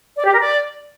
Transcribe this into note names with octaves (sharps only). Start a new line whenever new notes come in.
D5
G4
A#4
D5